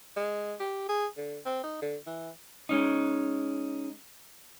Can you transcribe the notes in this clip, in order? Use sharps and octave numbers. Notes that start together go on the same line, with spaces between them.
G#3
G4
G#4
D3
C4
D#4
D3
E3
G#3 C#4 D#4